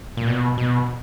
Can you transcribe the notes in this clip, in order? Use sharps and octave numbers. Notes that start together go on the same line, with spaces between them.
A#2
B2
B2